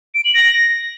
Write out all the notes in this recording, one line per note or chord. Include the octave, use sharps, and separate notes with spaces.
D7
F#7
A#6